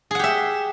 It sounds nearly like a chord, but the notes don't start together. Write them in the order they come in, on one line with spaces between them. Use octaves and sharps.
G#4 F#5 G4 E5